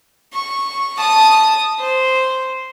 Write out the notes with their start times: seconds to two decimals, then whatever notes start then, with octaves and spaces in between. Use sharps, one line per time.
0.33 C#6
0.98 A5 D#6
1.80 C5